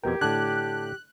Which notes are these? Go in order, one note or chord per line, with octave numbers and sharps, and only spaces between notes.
F2 B2 G4 A#4 G5 G#6
A2 D3 A5 D6 F#6 G#6